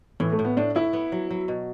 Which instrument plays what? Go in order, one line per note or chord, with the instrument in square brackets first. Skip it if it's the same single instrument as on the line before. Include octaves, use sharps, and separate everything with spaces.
[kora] A2 [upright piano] E3
[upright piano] A3
[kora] A2
[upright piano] B3
[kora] A2 [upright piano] D4
[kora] A2 [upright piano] E4
[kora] B3
F#3
F#3
B2